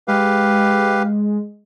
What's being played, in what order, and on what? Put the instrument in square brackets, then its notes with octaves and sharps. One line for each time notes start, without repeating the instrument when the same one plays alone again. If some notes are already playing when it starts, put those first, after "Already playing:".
[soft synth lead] G#3 [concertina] G4 B4 F5